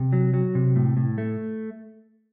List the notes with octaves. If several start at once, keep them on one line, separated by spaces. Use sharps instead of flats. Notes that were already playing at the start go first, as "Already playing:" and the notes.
Already playing: C3
F#3
F#3
C3
A2
A2
A3